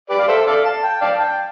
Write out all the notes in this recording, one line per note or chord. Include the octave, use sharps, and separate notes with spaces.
G4 B4 D5
F5
A4 C5 E5
A4 D5 F5
A5
G5
D5 F5 A5
G5